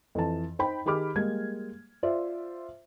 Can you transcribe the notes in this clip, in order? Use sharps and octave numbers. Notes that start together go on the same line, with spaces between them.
F2 E3 A5
D#4 C5 G5 B5
D#3 G4 G#4 B5 D6 F6
G3 G#3 A#3 G#6
F4 C5 D5 E5